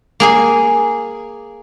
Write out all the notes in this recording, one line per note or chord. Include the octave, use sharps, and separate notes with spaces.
A#3 G#4 G#5